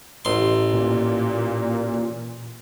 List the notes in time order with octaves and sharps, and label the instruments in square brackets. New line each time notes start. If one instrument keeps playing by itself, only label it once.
[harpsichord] A1 C6
[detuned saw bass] A#2